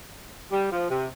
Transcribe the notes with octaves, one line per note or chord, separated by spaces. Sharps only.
G3
F3
C3